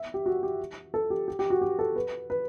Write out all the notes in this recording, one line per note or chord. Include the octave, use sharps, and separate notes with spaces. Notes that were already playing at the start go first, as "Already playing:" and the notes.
Already playing: E5
G4
F#4
G4
A4
G4
G4
G4
F#4
G4
A4
B4
B4